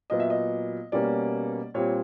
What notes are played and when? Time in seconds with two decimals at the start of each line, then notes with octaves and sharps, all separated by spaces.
0.10 A#2 F#3 B3 D#5
0.20 E5
0.30 D#5
0.92 B2 G3 A#3 C#4 D5
1.74 A#2 G3 C4 C#5